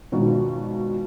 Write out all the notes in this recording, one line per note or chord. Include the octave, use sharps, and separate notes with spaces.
G#1 F2 B2 D#3 F#4